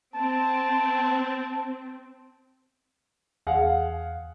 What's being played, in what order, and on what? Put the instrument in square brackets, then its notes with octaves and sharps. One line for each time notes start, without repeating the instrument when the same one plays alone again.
[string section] C4 [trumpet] A5
[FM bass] E2 [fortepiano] G#4 F5 F#5